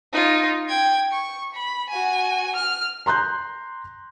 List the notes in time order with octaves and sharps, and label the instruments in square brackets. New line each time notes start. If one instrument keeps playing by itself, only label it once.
[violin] D#4 F4
G5 G#6
C#6
B5
F#4 G#5
F6
[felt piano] A#5 C6 F#6 G6